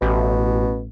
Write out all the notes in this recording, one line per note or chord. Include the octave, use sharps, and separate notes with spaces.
A1 B2